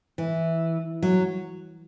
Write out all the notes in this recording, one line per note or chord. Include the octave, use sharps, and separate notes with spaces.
E3
F#3